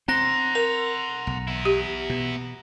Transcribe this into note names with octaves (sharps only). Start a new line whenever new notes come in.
C4 F#5 A#5 C6 F#6 A#6
A#4 F7
B1
B3 E4
G4
B2